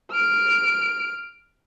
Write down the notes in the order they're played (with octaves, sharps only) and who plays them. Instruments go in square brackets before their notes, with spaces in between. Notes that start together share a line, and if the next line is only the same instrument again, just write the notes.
[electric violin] F6 D7